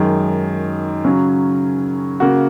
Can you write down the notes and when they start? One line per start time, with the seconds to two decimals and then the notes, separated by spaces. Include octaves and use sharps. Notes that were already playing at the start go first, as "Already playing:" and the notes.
Already playing: F#2 D#3 G#3
1.05 C#3 F#3 C#4
2.20 C#3 A#3 F#4